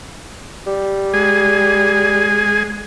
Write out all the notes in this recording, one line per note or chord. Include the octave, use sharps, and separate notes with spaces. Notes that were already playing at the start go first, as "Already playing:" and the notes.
G3
G#3 G#4 G#5